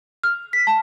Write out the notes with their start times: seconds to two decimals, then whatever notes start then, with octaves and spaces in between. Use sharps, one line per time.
0.23 F6
0.53 B6
0.67 A5